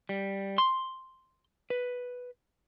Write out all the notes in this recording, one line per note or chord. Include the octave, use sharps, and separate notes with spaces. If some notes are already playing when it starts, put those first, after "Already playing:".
G3
C6
B4